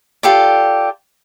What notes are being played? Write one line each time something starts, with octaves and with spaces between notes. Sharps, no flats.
F4 G4 A4 D5